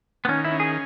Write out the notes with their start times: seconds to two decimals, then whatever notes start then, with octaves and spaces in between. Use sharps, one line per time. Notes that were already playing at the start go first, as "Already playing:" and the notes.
0.25 B3
0.28 D#3 C#4
0.44 E4
0.51 C#4
0.60 G#4